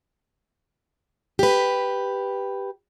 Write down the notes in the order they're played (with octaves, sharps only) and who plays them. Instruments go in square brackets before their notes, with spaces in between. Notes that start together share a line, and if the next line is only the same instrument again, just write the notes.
[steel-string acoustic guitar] G4 B4